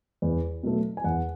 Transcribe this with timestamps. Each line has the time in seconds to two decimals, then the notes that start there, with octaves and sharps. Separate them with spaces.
0.22 E2
0.63 B2 F#3 A3
0.97 G#5
1.04 E2 F#5